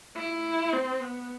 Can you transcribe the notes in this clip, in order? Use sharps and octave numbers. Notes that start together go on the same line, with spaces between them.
E4
C4
B3